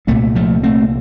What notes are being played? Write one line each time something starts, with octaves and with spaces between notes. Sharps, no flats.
C2 A#2 A3 C4
F3 A3
A3 C4